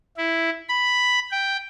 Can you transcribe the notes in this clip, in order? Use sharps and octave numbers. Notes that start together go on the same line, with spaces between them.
E4
B5
G5